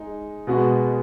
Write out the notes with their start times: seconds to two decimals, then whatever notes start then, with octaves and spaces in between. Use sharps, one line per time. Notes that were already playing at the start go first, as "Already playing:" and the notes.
Already playing: G#3 D#4
0.47 B2 G#3 B3 F#4